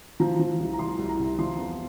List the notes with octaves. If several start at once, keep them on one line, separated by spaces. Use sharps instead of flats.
F3 A#5
F3
C2
A#5
C2 C6
C2
A#5
C3
F3 C6
E2